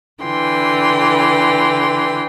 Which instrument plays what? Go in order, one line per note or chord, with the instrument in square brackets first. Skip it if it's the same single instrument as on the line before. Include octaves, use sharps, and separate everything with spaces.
[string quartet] D3 E3 G5 C6